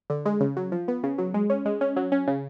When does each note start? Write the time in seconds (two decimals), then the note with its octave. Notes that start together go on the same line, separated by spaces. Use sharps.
0.10 D3
0.25 G#3
0.40 C#3
0.57 F#3
0.72 F3
0.88 B3
1.03 C#3
1.18 F#3
1.34 G#3
1.50 C#4
1.65 G#3
1.81 C#4
1.96 F#3
2.12 C#4
2.27 C#3